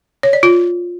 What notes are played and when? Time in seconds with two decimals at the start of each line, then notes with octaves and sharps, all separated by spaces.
0.23 C#5
0.33 D5
0.43 F4